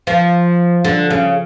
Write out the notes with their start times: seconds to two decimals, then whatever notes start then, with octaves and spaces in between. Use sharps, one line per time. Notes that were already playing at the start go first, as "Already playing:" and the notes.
0.07 F3
0.85 D3
1.10 C#3